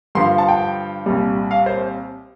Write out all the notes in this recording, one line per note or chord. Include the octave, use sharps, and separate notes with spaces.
G2 D3 F3 C6
A5
G5
C2 A#2 G3
F5
C5